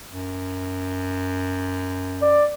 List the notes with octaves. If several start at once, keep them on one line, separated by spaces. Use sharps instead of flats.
F#2
D5